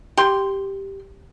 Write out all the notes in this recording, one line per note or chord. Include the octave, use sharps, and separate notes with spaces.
G4 C6